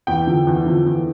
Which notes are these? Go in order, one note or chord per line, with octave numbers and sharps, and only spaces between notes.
E2 G5
D3 F3
E2
D3 F3
E2